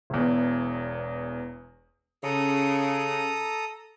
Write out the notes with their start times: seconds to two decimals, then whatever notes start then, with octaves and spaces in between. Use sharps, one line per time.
0.10 E1 E2
2.24 C#3 A4 A#5 D#6